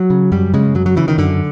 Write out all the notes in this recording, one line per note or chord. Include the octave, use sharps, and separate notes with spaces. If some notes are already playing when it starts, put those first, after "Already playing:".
Already playing: F#3
C#3
F#2 G3
C#3 G#3
F#2 F#3
F#3
C#3 E3
D#3
F#2 D3